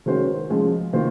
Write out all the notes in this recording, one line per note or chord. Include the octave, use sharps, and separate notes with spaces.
D#3 G#3 C#4 F#4 C5
C#3 F3 G#3
D#3 A#3 F4 C5